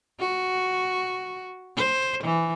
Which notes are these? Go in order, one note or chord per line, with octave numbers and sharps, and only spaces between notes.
F#4
C5
E3